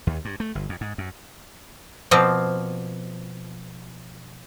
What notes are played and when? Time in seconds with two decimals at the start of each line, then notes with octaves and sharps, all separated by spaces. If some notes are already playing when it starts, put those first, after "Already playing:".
0.07 D#2
0.25 G2
0.40 A3
0.55 G1
0.69 F2
0.81 G#2
0.98 F#2
2.11 B2 F3 A#3 C4